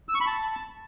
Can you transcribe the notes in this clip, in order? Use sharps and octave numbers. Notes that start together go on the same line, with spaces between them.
E6
C#6
B5
A5